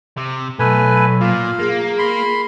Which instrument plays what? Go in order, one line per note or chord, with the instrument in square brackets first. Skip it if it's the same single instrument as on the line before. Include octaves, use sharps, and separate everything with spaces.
[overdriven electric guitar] C3
[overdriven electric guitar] B1 [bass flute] F#3 [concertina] A3 B4 G#5
[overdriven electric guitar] A#2 [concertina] F4
[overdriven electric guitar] A#3 [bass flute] G#4
[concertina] B5 C6